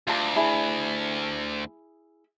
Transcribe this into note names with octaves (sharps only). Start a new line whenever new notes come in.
D2 F4 A5 D6
E4 G#4